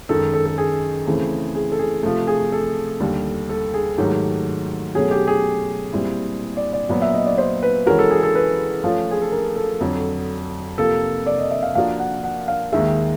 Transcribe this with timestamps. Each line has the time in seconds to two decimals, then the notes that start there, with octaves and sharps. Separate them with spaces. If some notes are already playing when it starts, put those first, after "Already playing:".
0.09 F#2 D#3 G#3 A4
0.34 A4
0.45 A4
0.58 G#4
1.07 C#3 E3 A3 C4
1.55 G#4
1.72 A4
1.79 G#4
2.03 C3 F3 A3
2.27 G#4
2.52 A4
3.00 D#2 D3 G3
3.49 A4
3.74 G#4
3.98 G#2 D#3 F#3 A3 G4
4.95 B2 F#3 A3 C#4 F#4 G#4
5.11 G4
5.27 G#4
5.93 A#2 G3 C4 E4
6.57 D5
6.73 D5
6.89 A#2 F#3 B3 D5
7.02 E5
7.14 D#5
7.26 D5
7.38 C5
7.63 B4
7.86 E3 G#3 C#4 F#4 A#4
7.99 A4
8.11 G#4
8.23 A4
8.35 B4
8.84 F3 A3 C#4 F4
9.11 G#4
9.21 A4
9.32 A#4
9.56 A4
9.81 F2 D3 F#3
10.78 C3 F3 A#3 A4
11.26 D5
11.38 D#5
11.51 E5
11.63 F5
11.75 F3 A#3 D4 F#4 A#4 F5
11.99 F#5
12.24 F#5
12.48 F5
12.72 D#2 D#3 G#3 E5